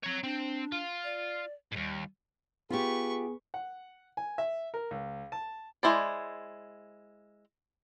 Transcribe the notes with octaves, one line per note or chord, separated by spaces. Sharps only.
C4 C#5 A#5
C4 D4
F4
D5
D#2 G#2 G3
B3 F4 G4 G#4 B4 C#6
F#5
G#5
E5
A#4
C#2
A5
G#3 A#3 E4 C5 D5